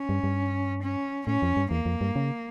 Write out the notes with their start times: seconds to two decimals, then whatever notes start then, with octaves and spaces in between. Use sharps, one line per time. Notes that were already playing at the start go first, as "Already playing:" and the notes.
Already playing: C#4
0.09 G2
0.24 G2
0.83 C#4
1.27 A2 C#4
1.42 F2
1.57 G2
1.71 E2 A#3
1.86 F2
2.01 G2
2.16 C#3